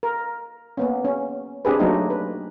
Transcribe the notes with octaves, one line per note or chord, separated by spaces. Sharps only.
A#4
A#3 B3 C#4
C#4
C4 D4 G4 G#4 B4
F#3 A3 A#3 C4 D4 D#4
B4